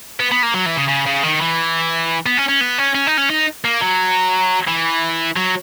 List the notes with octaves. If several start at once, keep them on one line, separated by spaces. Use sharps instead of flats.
B3
B3
A#3
F#3
E3
C#3
C#3
C#3
D#3
E3
B3
C#4
C#4
B3
C#4
C#4
D#4
C#4
D#4
A#3
F#3
E3
F#3